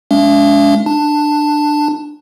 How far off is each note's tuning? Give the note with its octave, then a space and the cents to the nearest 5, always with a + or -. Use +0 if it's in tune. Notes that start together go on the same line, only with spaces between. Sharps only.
G#3 +20 D4 -45 E5 +45
D4 +20 A5 +10